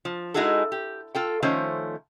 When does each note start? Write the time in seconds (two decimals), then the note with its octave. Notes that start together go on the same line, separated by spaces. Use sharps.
0.05 F3
0.34 G#3 D#4 E4 F#4 G#4 A4
0.72 G4
1.15 F4 A4 G5
1.43 D#3 F3 A3 C#4 C5